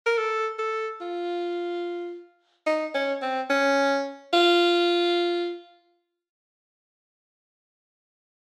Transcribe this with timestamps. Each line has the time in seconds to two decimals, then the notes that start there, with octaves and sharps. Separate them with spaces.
0.06 A#4
0.18 A4
0.59 A4
1.01 F4
2.67 D#4
2.94 C#4
3.22 C4
3.50 C#4
4.33 F4